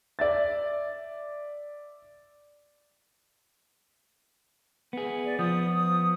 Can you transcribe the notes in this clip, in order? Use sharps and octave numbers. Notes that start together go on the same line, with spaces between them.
D5 E5 A6
B3 G#4
D5
F3 B3 D#6
D#6